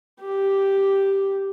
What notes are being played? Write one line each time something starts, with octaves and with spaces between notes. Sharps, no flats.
G4